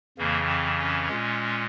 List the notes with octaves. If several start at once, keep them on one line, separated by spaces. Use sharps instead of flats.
F2 C#3 E3 A#3
C4
C#4
A#2 G#3